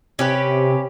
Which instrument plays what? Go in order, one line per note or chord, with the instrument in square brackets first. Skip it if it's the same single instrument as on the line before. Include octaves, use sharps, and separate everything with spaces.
[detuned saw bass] C3 [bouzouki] C#4 G4 B4